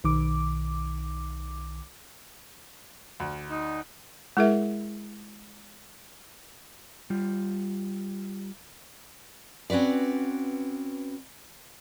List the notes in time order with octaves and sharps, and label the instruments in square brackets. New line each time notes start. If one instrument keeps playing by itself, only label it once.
[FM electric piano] B1 D#3 D6
[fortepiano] D2
[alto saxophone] D#4
[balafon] G#3 E4 G#4 A#4 E5
[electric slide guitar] G3 F4
[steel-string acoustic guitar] C4 C#4 F#4 B4 D5